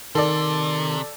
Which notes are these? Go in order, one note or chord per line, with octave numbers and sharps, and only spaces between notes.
C3 D#3 A4 D5